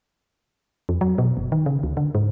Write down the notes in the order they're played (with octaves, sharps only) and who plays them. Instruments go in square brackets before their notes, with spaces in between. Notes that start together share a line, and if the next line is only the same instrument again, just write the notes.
[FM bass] F2
F#3
B2
F#1
D#3
C#3
D2
D3
G#2